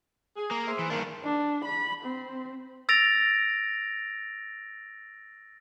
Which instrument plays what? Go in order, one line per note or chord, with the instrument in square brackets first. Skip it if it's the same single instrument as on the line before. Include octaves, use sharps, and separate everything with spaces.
[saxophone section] G#4
[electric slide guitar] A#3
[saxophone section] G#4 C5 E5
[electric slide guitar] E3
[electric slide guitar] G2 D#3 D4 [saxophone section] A#3
[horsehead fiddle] D4
B5
C4
[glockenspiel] E6 A6 A#6 D7 F7